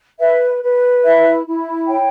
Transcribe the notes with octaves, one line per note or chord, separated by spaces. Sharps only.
B4 E5
B4
E4 E5
E4
C#5 G5